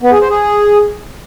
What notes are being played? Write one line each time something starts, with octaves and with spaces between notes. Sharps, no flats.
B3
G#4
C5
G#4